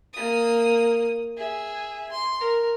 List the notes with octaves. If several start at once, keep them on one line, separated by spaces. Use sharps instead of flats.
A#3 D#6
G#4 E5
C6
A#4